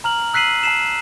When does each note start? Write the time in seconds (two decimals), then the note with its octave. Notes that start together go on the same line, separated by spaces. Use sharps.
0.04 A#5 F6 F#7
0.34 E6 F#6 B6 C7 D#7 F#7
0.63 A5 C7 E7